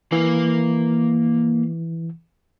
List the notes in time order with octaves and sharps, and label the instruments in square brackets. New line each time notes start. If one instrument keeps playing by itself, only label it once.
[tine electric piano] E3 [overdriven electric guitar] A#3 F5